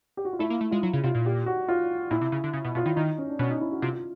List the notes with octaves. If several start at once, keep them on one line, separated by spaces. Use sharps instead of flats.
G4
F#4
F4
A3 E4
A#3
A3
G#3 F4
F#3 E4
C#3
C3 F4
A#2
G4
F#4
F4
A#2 E4
C3
C#3
D3
C#3
B2
B2 F4
D#3 E4
D#3 D#4
C#4
D4
B2 C#4
D#4
E4
F#4
C3 F4
F4